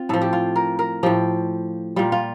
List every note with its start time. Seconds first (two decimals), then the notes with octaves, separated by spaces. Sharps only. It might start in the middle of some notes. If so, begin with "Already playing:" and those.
Already playing: C4 F4
0.09 A2 F3 A4
0.22 G4
0.33 F4
0.56 A#4
0.79 A#4
1.03 A2 F3 G4
1.96 A#2 G3 F4
2.12 F4